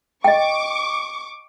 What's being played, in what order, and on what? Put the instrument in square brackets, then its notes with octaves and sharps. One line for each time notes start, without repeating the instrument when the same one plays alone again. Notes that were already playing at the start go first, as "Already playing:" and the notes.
[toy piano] D#5 G5 [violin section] C#6 D6